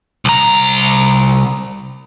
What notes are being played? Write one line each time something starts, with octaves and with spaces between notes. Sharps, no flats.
C2 A#5